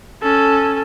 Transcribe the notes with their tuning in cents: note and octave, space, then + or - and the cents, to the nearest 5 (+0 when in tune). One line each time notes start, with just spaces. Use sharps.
C#4 +0 A4 +0